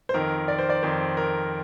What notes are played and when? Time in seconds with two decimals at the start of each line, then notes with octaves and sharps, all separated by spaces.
0.09 C5
0.14 F2 D#3 A#4
0.48 D5
0.59 C5
0.70 D5
0.83 F2 D#3 C5
1.17 A#4